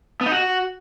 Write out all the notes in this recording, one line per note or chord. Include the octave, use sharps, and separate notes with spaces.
B3
D#4
F#4